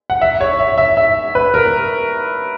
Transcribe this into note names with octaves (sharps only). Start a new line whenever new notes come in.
F#5
E5
C#5
E5
E5
E5
B4
A#4